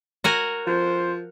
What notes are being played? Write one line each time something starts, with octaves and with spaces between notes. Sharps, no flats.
F#4 A#4 G#5
F3 C5